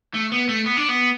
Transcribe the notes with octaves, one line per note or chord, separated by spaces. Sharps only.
A3
B3
A3
B3
D4
B3